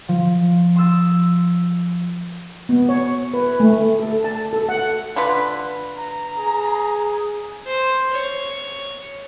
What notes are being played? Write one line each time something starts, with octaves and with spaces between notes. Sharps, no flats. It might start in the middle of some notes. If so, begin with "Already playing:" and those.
F3
C6 D#6 E6 A6
B3
C#5
B4
A3
A4
A5
A4
F#5
D3 F4 B4
A#5
G#4
C5
C#5